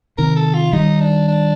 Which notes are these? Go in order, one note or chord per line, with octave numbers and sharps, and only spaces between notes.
C3 D#3 A#4
A4
F4
D#3 G3 D#4
D4
D4